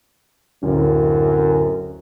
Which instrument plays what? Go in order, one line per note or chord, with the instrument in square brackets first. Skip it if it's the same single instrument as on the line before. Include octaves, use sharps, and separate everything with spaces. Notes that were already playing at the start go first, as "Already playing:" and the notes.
[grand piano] D1 [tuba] F#2